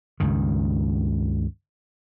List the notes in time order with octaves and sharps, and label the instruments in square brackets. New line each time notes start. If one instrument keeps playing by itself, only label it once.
[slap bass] C#2 G2 D#3